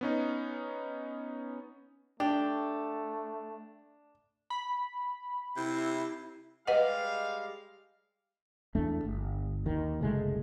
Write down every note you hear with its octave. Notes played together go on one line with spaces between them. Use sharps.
B3 C#4 D#4
A3 D4 G4
B5
C3 E4
G3 G#3 B4 D#5 F5 F#5
E2 A3 D4
G1
D#2 D#3
F#1 C2 G#3 A3